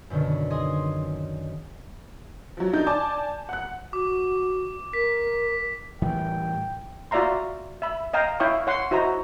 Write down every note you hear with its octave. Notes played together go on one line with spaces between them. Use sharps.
F#2 B2 D3 D#3
G#4 D#5 G#5 C6 D#6
F3 F#3
D#3 D4 D#4 G6
D5 G#5 A5 D6
F#5 F#6
F#4 D6
A#4 B6
A2 E3 G3 G5
F4 F#4 D5 E5 A#5 C6
E5 B5
D#5 F5 G5 A#5
E4 C#5 F5 G5 C#6 D#6
C#5 F#5 C6
E4 F#4 C5 D#5 A#5